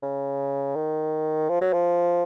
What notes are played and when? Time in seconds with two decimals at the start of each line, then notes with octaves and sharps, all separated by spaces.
0.02 C#3
0.76 D#3
1.49 F3
1.61 F#3
1.73 F3